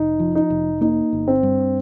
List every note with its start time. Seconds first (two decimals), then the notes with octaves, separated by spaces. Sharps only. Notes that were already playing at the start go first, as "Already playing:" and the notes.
Already playing: F1 D#4
0.20 F3
0.35 D#4
0.50 F1
0.81 A#3 D#4
1.13 G1
1.28 C4
1.43 G2